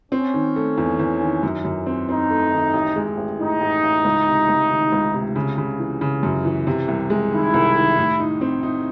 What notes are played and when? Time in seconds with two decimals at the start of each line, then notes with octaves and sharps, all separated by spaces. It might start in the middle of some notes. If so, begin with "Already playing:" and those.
0.12 C4 C#4
0.34 D#3
0.56 A3
0.78 E2
0.99 E2
1.21 D#3
1.43 F#2
1.65 F#2
1.86 C4
2.09 C4 D#4
2.30 A3
2.52 D#3
2.74 A1
2.96 G#3
3.17 A1
3.40 A2 D#4
3.61 A1
3.83 A1
4.05 C#2
4.27 C3
4.49 C#2
4.70 D#3
4.92 C#2
5.14 C3
5.36 C#3
5.58 C#3
5.79 E3
6.01 C#3
6.23 F#2
6.45 E3
6.67 C3
6.88 C2
7.10 G#3
7.32 D#3 E4
7.54 C2
7.76 D#3
7.98 A2
8.20 D#4
8.41 C4
8.63 D#4